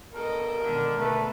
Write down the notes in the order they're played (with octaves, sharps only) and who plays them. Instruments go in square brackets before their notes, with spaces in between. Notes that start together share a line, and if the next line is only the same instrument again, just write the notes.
[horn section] G2 B2 [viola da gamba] A4 D#5 [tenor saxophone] A#4
[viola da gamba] B2 D#3 G#3 [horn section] D3
[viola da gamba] D3 A4 [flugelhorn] A3 [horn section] B4